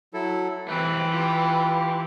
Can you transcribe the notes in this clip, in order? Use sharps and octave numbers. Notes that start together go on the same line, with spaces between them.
F#3 E4 A4
E3 A3 C4 B4
F4 G4